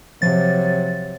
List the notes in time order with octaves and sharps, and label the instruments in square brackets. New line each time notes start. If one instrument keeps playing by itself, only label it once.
[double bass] C3 F#3 [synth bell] F3 A6